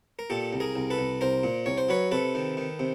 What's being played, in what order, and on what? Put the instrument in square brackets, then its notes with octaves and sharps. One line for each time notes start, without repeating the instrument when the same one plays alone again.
[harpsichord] A#4
A#2 G4 A4
C2
G#4 A#4
C2
A4 B4
C2
C2 A#4 C5
A#2
C2 C#5
C5
F#3 B4 C#5
C3 A4 B4
D#3
D#3
C3